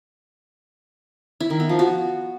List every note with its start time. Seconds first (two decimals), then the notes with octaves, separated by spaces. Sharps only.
1.40 E4
1.50 D#3
1.60 B3
1.69 F3
1.79 F#4